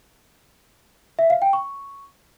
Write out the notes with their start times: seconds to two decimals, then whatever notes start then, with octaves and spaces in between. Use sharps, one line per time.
1.19 E5
1.30 F5
1.42 G5
1.53 C#6